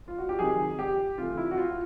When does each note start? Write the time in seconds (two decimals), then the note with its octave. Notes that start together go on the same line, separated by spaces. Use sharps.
0.08 F4
0.18 F#4
0.29 G4
0.39 C3 D#3 F#3 G#4
0.79 G4
1.18 C3 E3 A3 F4
1.37 E4
1.51 F#4
1.57 F4